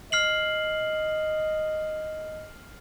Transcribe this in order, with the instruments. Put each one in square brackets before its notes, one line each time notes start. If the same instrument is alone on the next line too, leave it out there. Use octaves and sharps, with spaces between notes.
[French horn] D#5 [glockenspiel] F6 C7 F#7